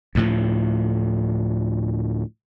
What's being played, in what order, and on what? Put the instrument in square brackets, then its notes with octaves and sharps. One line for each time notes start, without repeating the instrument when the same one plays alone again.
[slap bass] D2 A2 F3